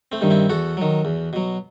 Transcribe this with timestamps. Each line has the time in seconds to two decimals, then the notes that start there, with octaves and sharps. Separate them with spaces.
0.12 A3 C4
0.21 G2 D#3
0.30 C4 E4
0.49 E2 F#4 A4
0.77 D#3 F#3
1.05 E2
1.33 B2 F#3